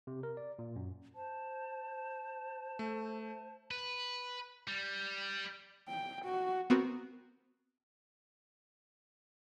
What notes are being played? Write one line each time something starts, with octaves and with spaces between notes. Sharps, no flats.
C3
A#4
D5
A#2
F#2
C5 A5
A3
B4
G3
G5
F#4
B3 C4 F#4 A#4